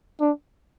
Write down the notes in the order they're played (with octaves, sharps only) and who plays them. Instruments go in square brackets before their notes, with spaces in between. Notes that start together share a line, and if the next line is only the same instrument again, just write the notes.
[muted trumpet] D4